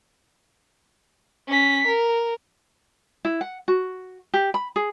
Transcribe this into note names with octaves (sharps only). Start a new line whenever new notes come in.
C#4 B6
A#4
E4
F#5
F#4
G4
B5
G#4